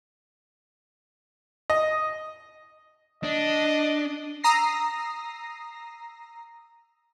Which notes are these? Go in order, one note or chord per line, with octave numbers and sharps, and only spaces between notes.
D#5
D4 D#5
A#5 D#6 E6 A#6 C7